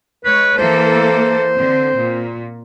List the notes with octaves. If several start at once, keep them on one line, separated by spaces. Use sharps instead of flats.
G#3 B4 C#5
E3 A#3 A4 C5
D3 C4
A#2